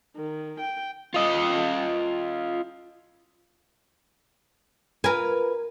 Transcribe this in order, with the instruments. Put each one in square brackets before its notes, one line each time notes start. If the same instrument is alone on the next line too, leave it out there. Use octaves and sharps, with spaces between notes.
[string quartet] D#3
G5
[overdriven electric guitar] F4 D#5
[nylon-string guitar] F4 B4 [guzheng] A#4 G#5